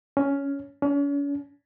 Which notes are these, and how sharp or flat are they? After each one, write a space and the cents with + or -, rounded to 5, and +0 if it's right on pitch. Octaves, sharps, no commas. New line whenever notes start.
C#4 +10
C#4 +40